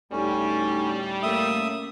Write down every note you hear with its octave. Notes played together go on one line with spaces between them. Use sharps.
D2 A2 G3 A3 C#4 D#4
A3 A#3 C#4 E5 D#6